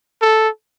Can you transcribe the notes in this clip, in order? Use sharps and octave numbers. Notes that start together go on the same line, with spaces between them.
A4